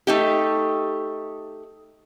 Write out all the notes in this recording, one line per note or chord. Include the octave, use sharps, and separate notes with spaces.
A3 D#4 G4